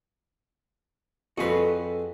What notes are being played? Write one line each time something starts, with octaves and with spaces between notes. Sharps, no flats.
F2 F#4 G#4 A4 B4 C5